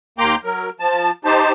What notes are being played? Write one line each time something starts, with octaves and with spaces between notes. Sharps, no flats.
D#2 A#3 G5 A#5 C6 D6
F#3 A#4
F3 A5
D#4 G4 C5 A5